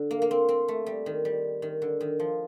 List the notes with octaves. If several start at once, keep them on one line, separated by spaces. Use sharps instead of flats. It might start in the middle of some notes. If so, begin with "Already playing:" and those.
Already playing: D3
A#3
A#3
C4
C4
A3
G3
D#3
G3
D#3
D3
D#3
F3